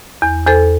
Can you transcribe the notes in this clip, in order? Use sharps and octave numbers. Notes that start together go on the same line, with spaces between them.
E2
E2 A4 C5